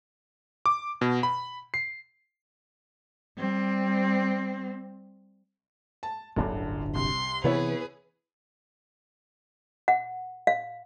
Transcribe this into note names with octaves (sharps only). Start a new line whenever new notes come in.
D6
B2
B5
C7
G3 C4
A5
D1 G1 F#2 D3 D4
C2 C6
C3 E3 B3 E4 G#4 B4 C#5
F#5
F5